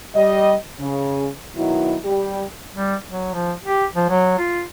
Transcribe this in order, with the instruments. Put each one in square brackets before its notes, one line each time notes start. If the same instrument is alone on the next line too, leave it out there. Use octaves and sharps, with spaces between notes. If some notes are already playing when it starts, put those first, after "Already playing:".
[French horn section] G3 D#5
C#3
B2 D#3 F#3 E4
G3 G4
[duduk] G3
F#3
F3
G4
F3
F#3
F4